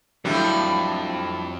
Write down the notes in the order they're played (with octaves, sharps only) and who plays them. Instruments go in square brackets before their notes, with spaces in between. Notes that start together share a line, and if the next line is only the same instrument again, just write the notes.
[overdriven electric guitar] F2 [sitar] A2 G3 D4 [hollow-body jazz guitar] F#3 E4